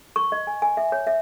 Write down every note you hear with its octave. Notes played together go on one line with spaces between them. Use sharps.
C#6
D#5
G#5
G#5
E5
C#5
E5